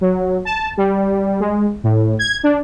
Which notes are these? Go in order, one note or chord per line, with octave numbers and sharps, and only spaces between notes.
F#3
A5
G3
G#3
A2
G#6
D4